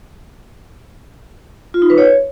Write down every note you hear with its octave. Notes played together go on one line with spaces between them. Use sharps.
F4
D#4
B4
C#5